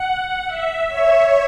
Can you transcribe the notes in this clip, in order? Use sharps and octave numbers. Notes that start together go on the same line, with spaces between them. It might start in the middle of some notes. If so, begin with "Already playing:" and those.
Already playing: F#5
E5
C#5